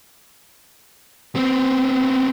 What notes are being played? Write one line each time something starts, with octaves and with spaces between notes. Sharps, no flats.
B3 C4